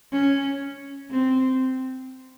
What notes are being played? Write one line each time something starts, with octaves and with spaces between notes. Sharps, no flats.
C#4
C4